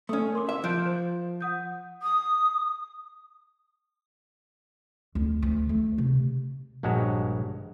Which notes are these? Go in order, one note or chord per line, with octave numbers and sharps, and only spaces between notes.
A3 C#4 D#6
A#4 C6 D6
E5
F3 F#6 G6 D7
C5
F#5 D#6 G6
D#6
D2
D2
A3
C3
A#1 G2 G#3 F#4 C#5 A#5